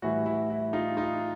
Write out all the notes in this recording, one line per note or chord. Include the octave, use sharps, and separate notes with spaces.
A2 E3 G3 E4 F#4
E4
E4
D#4 F4
D#4 F4